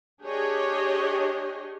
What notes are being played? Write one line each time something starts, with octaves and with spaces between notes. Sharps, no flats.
D4 G4 G#4 C#5 D#5